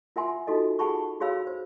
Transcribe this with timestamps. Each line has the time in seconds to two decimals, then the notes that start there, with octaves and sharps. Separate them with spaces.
0.16 F4 A#4 E5 F#5 G#5 C6
0.47 D#4 F4 F#4 A4 D#5
0.79 F4 G#4 F#5 A5 B5 C#6
1.20 F#4 G#4 C#5 F5 B5 E6
1.47 C5